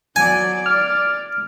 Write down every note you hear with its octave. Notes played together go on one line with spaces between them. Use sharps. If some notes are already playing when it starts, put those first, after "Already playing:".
F#3 D5 G#5
D5 F6